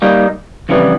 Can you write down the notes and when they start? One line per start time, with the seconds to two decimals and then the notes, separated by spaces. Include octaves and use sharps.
0.02 G3 A#3 D#4
0.69 F2 C#3 E3 G3 B3